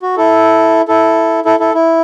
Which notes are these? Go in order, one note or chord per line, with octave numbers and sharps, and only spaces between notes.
F#4
E4 A4
E4 A4
E4 A4
E4 A4
E4